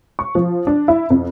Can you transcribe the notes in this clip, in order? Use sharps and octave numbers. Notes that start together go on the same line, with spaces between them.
C#6
F3
D4
E4
F2